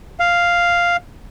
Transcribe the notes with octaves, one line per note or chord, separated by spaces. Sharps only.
F5